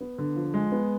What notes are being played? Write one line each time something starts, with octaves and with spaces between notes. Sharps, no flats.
B3
D3
F3
G#3
B3